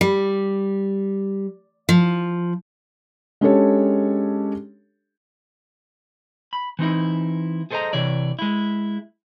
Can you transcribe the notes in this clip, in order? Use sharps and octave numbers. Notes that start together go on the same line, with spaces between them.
G3
F3
G#3 C#4 D4 G4 A4 C#5
B5
E3 C4 D#4 E4
G#4 A4 C5 D5 D#5 A#5
C3 E3 C#5 D5
G#3 E4